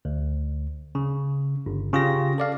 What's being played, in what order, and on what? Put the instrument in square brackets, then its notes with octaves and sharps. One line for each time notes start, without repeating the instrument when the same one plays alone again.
[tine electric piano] D2
C#3
G1
C#3 F4 G4 A#6
A4 D5 F5